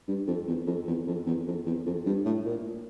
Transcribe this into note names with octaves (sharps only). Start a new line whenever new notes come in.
G2
F2
E2
F2
E2
F2
E2
F2
E2
F2
G2
A2
A#2